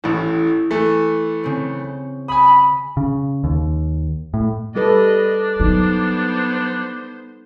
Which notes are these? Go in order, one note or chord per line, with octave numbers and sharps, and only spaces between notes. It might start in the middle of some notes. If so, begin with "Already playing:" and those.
A1 A2 E4
E3 A3
C#3 C4
G#5 B5 D#6
C#3
D#2
A2
G3 D4 A4 B4 D#5
F#3 B3 D#4 C5